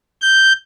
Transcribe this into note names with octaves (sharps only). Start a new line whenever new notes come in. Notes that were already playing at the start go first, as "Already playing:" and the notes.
G6